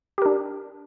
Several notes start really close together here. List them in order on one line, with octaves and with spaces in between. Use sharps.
G4 A#4 D4